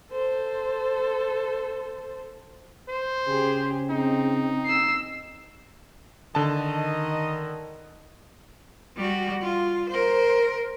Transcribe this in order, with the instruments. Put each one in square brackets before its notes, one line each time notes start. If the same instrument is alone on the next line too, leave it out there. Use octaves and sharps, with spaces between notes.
[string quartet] A4 C5
[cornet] C5
[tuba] C#3 [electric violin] G4 G#4
[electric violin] C4 [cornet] D#4
[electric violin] E6 C7
[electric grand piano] D3 A5 [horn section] D#3 D#5
[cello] G3 F#4
F4
A#4 C5